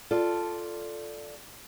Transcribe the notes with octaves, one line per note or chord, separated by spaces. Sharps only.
F4 A4 D5